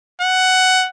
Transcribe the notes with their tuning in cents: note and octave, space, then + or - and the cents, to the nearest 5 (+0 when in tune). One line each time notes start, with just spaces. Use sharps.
F#5 +10